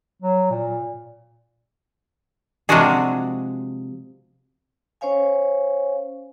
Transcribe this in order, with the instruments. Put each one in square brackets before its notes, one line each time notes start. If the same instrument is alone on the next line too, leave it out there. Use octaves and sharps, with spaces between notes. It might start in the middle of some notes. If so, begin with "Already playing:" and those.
[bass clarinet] F#3
A#2
[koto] C3 F3 G#3 D4 F#4 G#4
[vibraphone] C#4 C5 C#5 F5 G#5